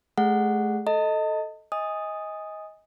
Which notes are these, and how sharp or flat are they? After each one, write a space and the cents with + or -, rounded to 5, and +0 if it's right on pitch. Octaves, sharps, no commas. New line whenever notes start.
A3 -40 G#4 -25 F#5 +0
A4 +0 D#5 +10 A5 +40
D#5 +20 G#5 -20 D#6 +0